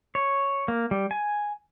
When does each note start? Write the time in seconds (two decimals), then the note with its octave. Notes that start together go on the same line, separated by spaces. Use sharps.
0.15 C#5
0.68 A#3
0.91 G3
1.11 G#5